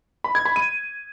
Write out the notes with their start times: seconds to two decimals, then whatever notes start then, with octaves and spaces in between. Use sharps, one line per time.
0.24 B5
0.35 G#6
0.45 B5
0.56 D#7